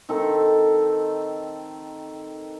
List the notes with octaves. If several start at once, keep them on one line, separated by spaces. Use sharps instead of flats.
D#3 C4 A4